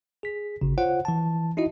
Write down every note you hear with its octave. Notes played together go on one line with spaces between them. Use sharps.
G#4 B6
G#1 C#3
F4 C5 C#5 F#5
E3 A5
D#4 E4 F#4 D#5